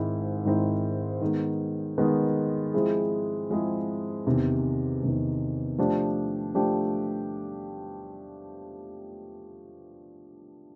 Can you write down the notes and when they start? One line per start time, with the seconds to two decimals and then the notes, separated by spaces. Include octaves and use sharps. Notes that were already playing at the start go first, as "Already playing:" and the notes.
Already playing: G#2 D#3 G#3 C4 E4
0.45 G#2 D#3 G#3 C4 E4
1.21 D#3 G#3 B3
1.98 D#3 G#3 B3
2.74 F3 G#3 C4 E4 G#4
3.50 F3 G#3 C4 E4 G#4
4.26 E2 C3 D#3
5.02 E2 C3 D#3
5.78 F3 A3 D4 G4
6.54 F3 A3 D4 G4